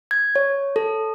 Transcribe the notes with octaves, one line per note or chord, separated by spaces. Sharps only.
G#6
C#5
A4